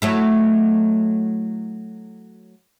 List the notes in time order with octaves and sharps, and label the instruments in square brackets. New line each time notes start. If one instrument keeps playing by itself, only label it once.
[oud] F#3 A3 E4